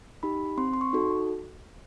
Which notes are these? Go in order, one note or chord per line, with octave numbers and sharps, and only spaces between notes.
D#4 G4 B5
C4 C6
C6
C#6
D#4 F#4 A4